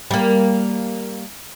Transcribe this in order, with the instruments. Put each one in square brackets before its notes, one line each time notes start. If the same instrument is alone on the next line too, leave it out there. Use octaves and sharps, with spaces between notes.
[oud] G3 A#3